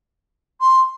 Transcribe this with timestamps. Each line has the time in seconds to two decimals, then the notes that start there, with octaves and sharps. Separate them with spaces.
0.60 C6